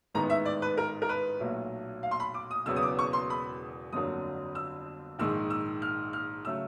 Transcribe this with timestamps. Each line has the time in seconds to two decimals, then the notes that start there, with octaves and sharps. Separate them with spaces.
0.15 A1 G#2 D#3 G#3 B3 A#5
0.30 E5
0.45 D5
0.62 B4
0.77 A#4
1.02 A#4
1.09 B4
1.40 B1 A#2 F#3 A3
2.03 F5
2.11 C6
2.20 B5
2.34 D6
2.51 D#6
2.66 E1 E2 C#3 F#3 B3 E6
2.76 D#6
2.83 D6
2.99 C#6
3.13 C6
3.30 B5
3.93 G1 F2 D3 F#3 A#3 D#6
4.55 E6
5.19 A#1 G#2 D#3 G#3 E6
5.50 E6
5.82 F6
6.13 F6
6.45 C#3 F#3 A3 E6